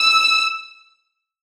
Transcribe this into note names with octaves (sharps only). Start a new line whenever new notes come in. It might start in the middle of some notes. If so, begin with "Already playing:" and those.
Already playing: E6